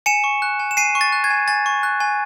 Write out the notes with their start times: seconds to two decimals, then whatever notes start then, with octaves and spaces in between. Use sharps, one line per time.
0.06 G#5 C#7 E7
0.24 C#6
0.42 F#6
0.60 G#5
0.71 E7
0.77 G#5 C7 D#7
0.95 C#6
1.01 A6
1.12 F#6
1.24 G#6
1.30 G#5
1.48 G#5 A6
1.66 C#6
1.83 F#6
2.00 G#5